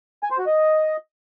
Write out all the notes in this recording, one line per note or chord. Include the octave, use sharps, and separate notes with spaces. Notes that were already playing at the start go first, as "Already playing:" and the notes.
G#5
C5
F#4
D#5